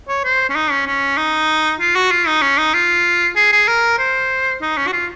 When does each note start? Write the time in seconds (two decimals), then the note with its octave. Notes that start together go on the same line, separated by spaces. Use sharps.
0.08 C#5
0.24 C5
0.49 C#4
0.55 D#4
0.71 C#4
0.86 C#4
1.17 D#4
1.80 F4
1.95 F#4
2.11 F4
2.27 D#4
2.42 C#4
2.58 D#4
2.74 F4
3.36 G#4
3.52 G#4
3.68 A#4
3.98 C5
4.62 D#4
4.77 C#4
4.88 F#4
4.92 F4